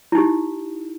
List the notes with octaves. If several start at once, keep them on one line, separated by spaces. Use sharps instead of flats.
D#4 E4 G4